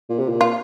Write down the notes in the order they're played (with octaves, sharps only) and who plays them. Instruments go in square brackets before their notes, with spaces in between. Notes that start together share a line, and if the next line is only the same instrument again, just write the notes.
[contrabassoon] A#2
C3
A#2
[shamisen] F4